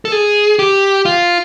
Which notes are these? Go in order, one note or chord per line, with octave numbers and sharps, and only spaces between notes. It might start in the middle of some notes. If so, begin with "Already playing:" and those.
A4
G#4
G4
F4